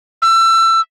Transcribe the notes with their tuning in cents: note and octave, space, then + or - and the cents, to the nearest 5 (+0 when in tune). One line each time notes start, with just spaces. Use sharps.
E6 +25